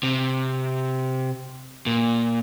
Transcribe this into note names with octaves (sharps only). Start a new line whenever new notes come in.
C3
A#2